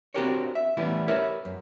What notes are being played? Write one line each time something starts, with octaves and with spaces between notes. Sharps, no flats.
C4 D4 F#4 G4 A#4 C#5
E5
E3 G3 A3 B3 C#4 E4
G4 A#4 B4 C#5 E5
F#2